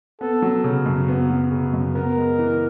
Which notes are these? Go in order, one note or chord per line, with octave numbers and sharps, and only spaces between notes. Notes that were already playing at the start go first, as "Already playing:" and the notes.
B3 A4
F#3
C#3
F#2
B3
F#3
C#3
F#2
B3 A#4
G#3
E3